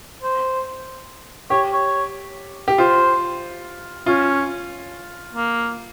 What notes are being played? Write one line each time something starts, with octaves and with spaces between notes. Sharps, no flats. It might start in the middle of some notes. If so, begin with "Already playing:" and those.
C5
G4 C#5
C#5
G4
F4 C5
C#4 F4
A#3